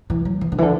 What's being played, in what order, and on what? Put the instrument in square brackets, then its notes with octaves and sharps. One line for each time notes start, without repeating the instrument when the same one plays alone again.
[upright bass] E3
F#3
E3
D3
E3
D3